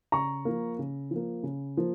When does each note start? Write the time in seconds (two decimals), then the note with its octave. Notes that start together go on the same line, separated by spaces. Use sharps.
0.12 C#3 A#5 C#6
0.45 F3 A#3
0.79 C#3
1.11 F3 A#3
1.43 C#3
1.77 F3 A#3